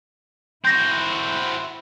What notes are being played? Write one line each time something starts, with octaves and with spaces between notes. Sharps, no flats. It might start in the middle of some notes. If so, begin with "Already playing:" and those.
C4 E4 F#4 G6 A#6